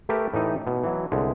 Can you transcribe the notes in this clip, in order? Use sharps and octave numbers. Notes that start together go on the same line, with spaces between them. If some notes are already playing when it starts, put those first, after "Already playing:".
A3 G4 A#4 B4 E5
A2 E3 D#4 G4
B2
E3 F#3
C2 D3 G#3